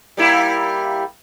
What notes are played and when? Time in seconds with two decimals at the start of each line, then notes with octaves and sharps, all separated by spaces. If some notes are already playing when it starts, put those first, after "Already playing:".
0.17 G3 A#3 E4